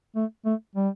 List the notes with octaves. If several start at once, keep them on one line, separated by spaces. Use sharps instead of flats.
A3
A3
G3